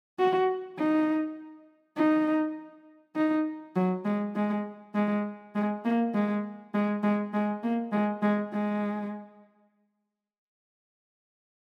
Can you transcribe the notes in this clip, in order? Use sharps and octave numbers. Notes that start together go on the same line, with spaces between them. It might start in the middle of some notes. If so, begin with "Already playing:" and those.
F#4
D#4
D#4
D#4
F#3
G#3
G#3
G#3
G#3
A#3
G#3
G#3
G#3
G#3
A#3
G#3
G#3
G#3